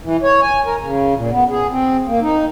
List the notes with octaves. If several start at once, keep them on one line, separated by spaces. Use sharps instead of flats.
E3
C#5
G#5
A#4
C#3
A#2
B3
G#4
C4
A#3
D#4